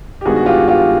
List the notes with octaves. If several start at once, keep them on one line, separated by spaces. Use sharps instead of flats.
G4
G2 D#3 G#3 B3 F#4 G#4
F#4
F4 G4
F4 G4